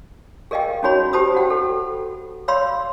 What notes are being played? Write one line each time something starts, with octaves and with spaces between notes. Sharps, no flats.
G#4 A#4 D#5 F5 G5
C#4 D#4 F#4 G#4 C#5 B5
G4 C5 A5 B5 D#6 E6
F#4 F#5 G5
A4
C#5 F5 B5 C6 E6